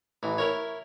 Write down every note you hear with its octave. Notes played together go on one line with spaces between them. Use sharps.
A1 E3
E4 A#4 C#5